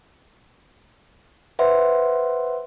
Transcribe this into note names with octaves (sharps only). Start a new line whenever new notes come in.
B4 C5 E5 F#5 C6